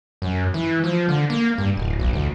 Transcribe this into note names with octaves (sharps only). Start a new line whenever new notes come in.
F#2
E3
F3
D3
A#3
G2
D1
B1
D2